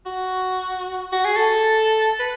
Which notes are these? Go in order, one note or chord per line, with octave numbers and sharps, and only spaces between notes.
F#4
F#4
G#4
A4
B4